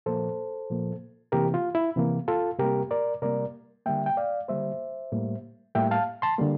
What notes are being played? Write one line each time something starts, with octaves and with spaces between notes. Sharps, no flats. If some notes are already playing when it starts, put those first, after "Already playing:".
A#2 F3 A#3 A4 C5
A#2 F3 A#3
C3 E3 A#3 G4 A#4
F4
E4
C3 E3 A#3
F4 A4
C3 G3 A#3 G4 A#4
A#4 D5
C3 G3 A#3 A#4 D5
D3 G3 A#3 E5 G5
G5
D5 F5
D3 G3 A#3 C5 E5
A2 G3 A#3
A2 G3 A#3 E5 G5
F5 A5
A5 C6
D3 G3 A#3